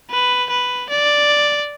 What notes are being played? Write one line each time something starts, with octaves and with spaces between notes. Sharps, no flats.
B4
B4
D5